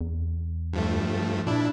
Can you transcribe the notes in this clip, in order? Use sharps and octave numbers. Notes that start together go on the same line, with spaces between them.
E2
G2 F3 A3
A#2 D4 E4